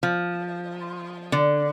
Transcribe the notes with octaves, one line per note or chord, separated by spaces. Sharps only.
F3
D3